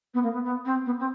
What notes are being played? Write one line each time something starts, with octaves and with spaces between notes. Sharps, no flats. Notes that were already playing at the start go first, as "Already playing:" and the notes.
B3
A#3
B3
B3
C4
B3
C4